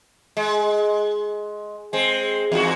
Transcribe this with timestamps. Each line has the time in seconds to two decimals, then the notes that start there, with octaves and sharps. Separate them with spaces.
0.37 G#3
1.93 G#3 C4
2.52 E2 G#2 F#4